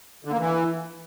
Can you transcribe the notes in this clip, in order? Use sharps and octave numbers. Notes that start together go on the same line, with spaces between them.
D3
A#3
E3